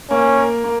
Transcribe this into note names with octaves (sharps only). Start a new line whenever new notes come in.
A#3 C#4
A#4
A#3